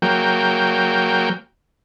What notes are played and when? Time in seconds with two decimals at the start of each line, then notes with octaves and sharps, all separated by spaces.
0.02 F#3 A#3 G5